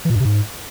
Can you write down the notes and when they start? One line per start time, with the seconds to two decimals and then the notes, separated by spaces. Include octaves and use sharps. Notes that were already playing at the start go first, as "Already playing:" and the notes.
0.05 E3
0.10 A#2
0.15 G2
0.20 C3
0.25 G#2